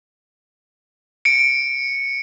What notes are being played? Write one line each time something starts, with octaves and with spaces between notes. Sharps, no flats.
C#7 D7